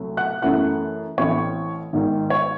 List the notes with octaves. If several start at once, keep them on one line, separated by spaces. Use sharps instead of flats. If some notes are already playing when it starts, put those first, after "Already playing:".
Already playing: C2 C3 F#3 A3
F#5 F#6
F#2 E3 A3 C#4 E4 F#5 F#6
A1 A2 E3 C4 E4 C#5 C#6
G#1 G#2 D#3
C#5